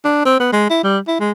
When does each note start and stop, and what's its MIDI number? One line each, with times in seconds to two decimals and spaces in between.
0.05 0.22 62
0.25 0.39 60
0.40 0.52 59
0.53 0.68 56
0.70 0.82 64
0.84 0.99 55
1.08 1.17 64
1.20 1.32 56